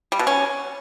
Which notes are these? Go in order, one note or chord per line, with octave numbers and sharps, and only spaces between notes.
G3
B2
C#4